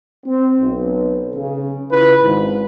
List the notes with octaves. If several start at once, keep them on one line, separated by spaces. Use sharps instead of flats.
C4
B1
C#3
C#3 E4 F4 B4
G#1 G#2